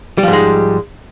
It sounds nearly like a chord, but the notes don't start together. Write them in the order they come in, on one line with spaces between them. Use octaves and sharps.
G3 F3 G#2 G#3